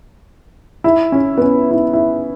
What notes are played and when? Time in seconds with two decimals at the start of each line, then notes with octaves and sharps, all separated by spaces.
0.84 E4
1.12 C#4
1.38 B3
1.42 C#4
1.71 E4
1.93 E4